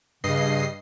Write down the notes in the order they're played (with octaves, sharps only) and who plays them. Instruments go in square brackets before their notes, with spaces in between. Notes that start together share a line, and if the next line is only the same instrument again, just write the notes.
[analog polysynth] G2 D#5 C7 [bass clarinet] C#3